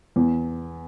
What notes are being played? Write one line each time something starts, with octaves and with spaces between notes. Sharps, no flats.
E2